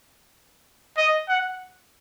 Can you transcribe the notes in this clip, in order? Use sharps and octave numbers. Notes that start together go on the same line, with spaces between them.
D#5
F#5